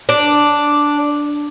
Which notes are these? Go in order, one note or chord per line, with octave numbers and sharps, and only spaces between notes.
D4